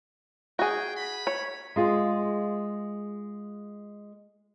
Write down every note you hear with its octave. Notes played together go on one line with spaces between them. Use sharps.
F#4 G#4 G5
B5
C#5
G#3 F4 G#4